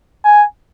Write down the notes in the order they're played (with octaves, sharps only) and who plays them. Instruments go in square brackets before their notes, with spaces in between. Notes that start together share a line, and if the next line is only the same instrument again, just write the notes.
[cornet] G#5